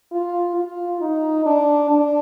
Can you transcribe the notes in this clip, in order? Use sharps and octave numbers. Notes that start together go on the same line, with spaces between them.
F4
F4
D#4
D4
D4